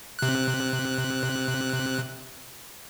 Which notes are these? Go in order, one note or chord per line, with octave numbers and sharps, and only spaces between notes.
C3 F#6